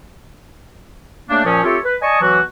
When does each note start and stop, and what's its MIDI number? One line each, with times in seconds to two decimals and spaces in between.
1.30 1.43 49
1.30 1.43 57
1.30 1.43 58
1.30 1.43 62
1.45 1.63 46
1.45 1.63 53
1.45 1.63 61
1.64 1.77 57
1.64 1.77 60
1.64 1.77 65
1.64 1.77 67
1.64 1.77 69
1.64 1.77 73
1.85 1.95 71
2.02 2.21 74
2.02 2.21 75
2.02 2.21 80
2.02 2.21 81
2.02 2.21 85
2.02 2.21 87
2.21 2.39 47
2.21 2.39 52
2.21 2.39 54
2.21 2.39 66